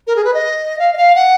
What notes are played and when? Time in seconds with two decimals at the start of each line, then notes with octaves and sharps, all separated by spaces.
0.07 A#4
0.16 G#4
0.25 B4
0.34 D#5
0.79 F5
0.93 D#5
0.97 F5
1.15 F#5